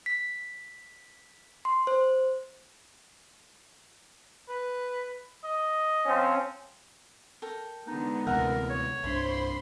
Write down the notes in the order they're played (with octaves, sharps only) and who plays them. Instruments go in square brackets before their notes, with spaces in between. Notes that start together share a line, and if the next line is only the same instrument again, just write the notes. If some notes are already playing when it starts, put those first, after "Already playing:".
[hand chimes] B6
C6
C5
[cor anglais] B4
D#5
[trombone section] F3 C4 C#4
[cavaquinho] A4 A#4 G5
[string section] D3 G#3 B3 [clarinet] D#4
[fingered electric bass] D2 C3 E3 [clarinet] A#4 [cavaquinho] E5 F#5 A#5
[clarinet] C#5
[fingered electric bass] C2 G2 D4 [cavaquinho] E4 [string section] C5 B5 C6